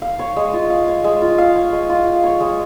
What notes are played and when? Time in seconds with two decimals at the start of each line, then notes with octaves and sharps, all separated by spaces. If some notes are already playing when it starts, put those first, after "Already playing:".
0.02 F5
0.19 C#5
0.36 G#3
0.53 F4
0.70 F5
0.88 C#5
1.04 G#3
1.22 F4
1.38 F5
1.56 C#5
1.72 G#3
1.89 F4
2.07 F5
2.24 C#5
2.40 G#3